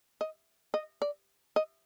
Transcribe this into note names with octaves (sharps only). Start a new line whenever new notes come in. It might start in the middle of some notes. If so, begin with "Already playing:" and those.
D#5
D#5
D5
D#5